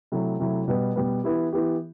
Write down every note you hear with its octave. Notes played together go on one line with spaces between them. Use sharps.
C3 F#3 A3 E4
C3 F#3 A3 E4
B2 G3 B3
B2 G3 B3
E3 B3 E4 G4
E3 B3 E4 G4